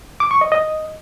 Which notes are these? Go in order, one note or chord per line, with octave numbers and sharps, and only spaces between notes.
D6
C#6
D#5
D#5